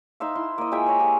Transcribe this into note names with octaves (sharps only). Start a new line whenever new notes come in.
D#4 C5 E5 F5
E4 C6
A#3 D#5
G#3 F4 E5 G5
C5 C#5 A#5
F4 G4 G#4